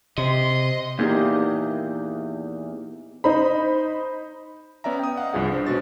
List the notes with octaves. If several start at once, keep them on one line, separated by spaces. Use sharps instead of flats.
C3 D#5 C6
E2 A#3 D#4 G4
D#4 C5 B5
B3 C#4 D5 E5 A#5
G5 D#6
D#5 F5 F#5
C2 G2 F3 G#4 F#5
D4 C5
B2 G#3 C#4 F#4 A6